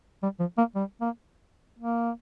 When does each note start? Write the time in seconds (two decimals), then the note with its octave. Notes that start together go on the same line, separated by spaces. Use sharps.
0.23 G3
0.40 F3
0.58 A#3
0.75 G3
1.01 A#3
1.79 A#3